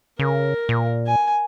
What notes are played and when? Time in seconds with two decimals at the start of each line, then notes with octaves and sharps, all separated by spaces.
0.19 C#3 A#4
0.69 A#2
1.07 G#5